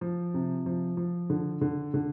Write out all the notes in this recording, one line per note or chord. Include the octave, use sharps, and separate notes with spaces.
F3
C3
F3
F3
D3
D3
D3